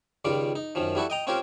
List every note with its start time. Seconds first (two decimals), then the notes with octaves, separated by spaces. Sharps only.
0.25 C#2 D#3 G3 F4 D5
0.55 D#4
0.75 F#2 D#3 F3
0.95 G3 E4 F#4 A4
1.10 D#5 G5 A#5
1.27 C4 C#4 F4 G4 A#4 C5